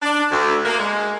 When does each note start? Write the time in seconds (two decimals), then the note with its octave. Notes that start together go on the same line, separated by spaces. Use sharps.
0.03 D4
0.31 D2
0.65 A#3
0.80 G#3